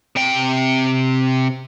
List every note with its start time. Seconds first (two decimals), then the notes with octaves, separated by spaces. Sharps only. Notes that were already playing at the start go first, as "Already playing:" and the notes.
0.16 C3 G5